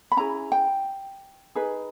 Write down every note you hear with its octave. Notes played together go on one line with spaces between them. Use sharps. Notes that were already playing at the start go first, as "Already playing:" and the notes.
B5
C#4 E4 G#4 A#5
G5
D#4 G#4 B4